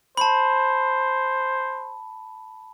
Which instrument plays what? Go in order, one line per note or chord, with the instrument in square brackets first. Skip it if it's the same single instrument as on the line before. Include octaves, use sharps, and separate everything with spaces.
[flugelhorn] C5 [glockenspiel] A5 B5